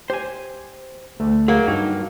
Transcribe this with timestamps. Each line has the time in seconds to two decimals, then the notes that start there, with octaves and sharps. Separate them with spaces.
0.10 G4 C5 G#5
1.20 D2 A3
1.48 F#3 A#3 G#4
1.68 G2 D#4 F#4 G4